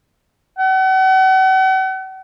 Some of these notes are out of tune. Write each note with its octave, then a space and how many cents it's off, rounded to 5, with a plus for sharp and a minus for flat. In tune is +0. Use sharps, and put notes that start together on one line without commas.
F#5 +40